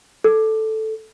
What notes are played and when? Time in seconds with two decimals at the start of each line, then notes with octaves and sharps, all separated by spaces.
0.24 A4